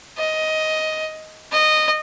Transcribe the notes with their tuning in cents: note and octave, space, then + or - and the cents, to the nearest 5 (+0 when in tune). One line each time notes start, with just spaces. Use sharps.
D#5 +10
D#5 -15